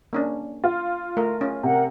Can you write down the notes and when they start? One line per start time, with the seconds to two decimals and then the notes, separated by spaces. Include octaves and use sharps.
0.13 A#3 C#4 D4
0.64 F4
1.17 A3 A#4
1.41 C#4
1.63 C3 A#4 F#5